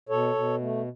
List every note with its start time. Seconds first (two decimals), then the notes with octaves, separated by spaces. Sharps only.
0.09 B2 A4 C#5
0.35 B2
0.60 A3